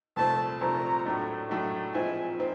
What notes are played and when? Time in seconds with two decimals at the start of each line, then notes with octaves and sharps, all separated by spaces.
0.16 C2 A#2 F3 A3 C4 A5
0.61 C2 A#2 F3 A3 C4 A#5
1.05 A2 F#3 A3 D4
1.49 A2 F#3 A3 D4
1.94 A#2 F3 G#3 C4 E4 G#5
2.39 A#2 F3 C4